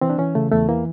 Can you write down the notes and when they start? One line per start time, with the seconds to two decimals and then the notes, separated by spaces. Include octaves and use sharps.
0.01 E3 C4
0.10 D4
0.19 E3 C#4
0.35 C#3 A3
0.52 E2 A3
0.69 E3 A#3